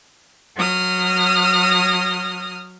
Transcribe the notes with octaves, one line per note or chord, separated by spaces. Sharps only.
F#3 D#6 F6